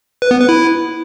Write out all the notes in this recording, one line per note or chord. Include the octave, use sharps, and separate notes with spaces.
B4
B3
B4
E4